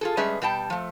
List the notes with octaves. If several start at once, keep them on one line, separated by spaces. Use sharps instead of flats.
F4 G#4 A4
G3 G#3 C#4 G#4 B4 E5
B2 G3 G5 A5
F3 A3